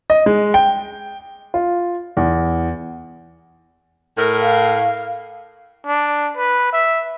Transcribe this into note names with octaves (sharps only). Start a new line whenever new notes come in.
D#5
G#3
G5
F4
E2
A2 A#4
F5
D4
B4
E5